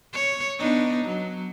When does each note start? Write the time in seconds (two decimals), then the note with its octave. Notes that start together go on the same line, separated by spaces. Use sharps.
0.13 C#5
0.59 B3 D4 D#4
1.05 F#3